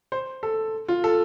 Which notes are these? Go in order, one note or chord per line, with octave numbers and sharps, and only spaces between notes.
C5
A4
F4
A4